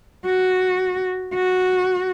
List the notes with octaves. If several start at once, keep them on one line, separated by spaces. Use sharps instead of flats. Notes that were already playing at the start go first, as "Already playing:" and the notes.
F#4
F#4